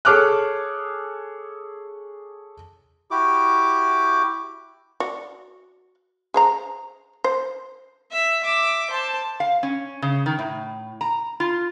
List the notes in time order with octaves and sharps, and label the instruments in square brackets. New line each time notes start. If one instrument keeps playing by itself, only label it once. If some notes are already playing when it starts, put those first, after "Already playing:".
[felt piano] G#4 A4 C#5 D6 F6 F#6
[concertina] E4 F#4 G4 D6
[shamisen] F#4 D5
G#4 C5 A#5
C5
[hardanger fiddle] E5
E5 D6
C5 A5
[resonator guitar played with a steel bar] F5
C#4
C#3
D#3
A2
A#5
F4